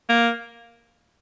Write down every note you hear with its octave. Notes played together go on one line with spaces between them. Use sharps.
A#3